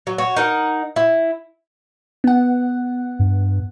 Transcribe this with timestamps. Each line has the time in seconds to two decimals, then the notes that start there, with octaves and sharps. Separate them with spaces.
0.07 F#3
0.18 F#4 C#5
0.36 D#4 A#4 F#5
0.96 E4
2.24 B3 F#5
3.19 G2